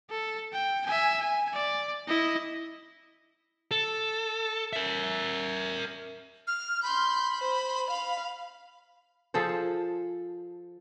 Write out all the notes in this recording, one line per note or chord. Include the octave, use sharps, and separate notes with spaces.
A4
G5
E5 G#5
G#5
D5
E4 D#5
A4
A#4 E5
F6
B5 C6 G6
C5
F5
F3 G#4 A4 C5